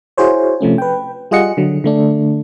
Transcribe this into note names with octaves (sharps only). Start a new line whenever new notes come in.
E4 F#4 G#4 C5 C#5
C3 F3 A3 C#4
B4 G5
G3 F4 G#4 D#5 F#5 C#7
D3 F#3
D3 A3 D4